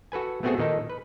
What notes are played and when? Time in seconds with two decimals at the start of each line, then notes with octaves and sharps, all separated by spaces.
0.12 F#4 A4 B4 G#5
0.43 A3 B3 C4 F#4 G#4 A4
0.58 A#2 D#3 D#4 A4
0.90 B4